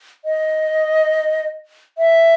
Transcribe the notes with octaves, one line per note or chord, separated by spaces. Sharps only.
D#5
E5